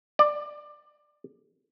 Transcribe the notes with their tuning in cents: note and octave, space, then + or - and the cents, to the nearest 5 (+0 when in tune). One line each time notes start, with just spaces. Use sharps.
D5 +15